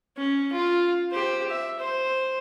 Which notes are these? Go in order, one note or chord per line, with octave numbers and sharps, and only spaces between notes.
C#4
F4
G4 C5
E5
C5